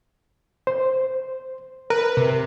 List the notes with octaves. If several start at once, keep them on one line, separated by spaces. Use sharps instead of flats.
C5
A#4 B4
C3